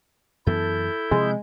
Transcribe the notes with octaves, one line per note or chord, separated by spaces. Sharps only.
F#2 E3 B3 E4 A4 G6
C3 F3 G#3 C4